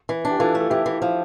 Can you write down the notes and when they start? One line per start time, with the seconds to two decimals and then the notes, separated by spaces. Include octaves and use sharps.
0.09 E3
0.25 D4
0.30 G4
0.39 E3 F4 A4
0.55 A3
0.60 A4
0.70 E3 E4 G4
0.86 E3
1.02 F3